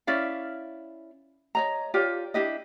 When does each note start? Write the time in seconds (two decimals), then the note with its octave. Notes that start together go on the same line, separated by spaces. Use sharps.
0.07 C#4 E4 D5 F5
1.55 C#5 D#5 A#5
1.94 F4 G4 C#5 D5
2.34 D4 E4 G4 D#5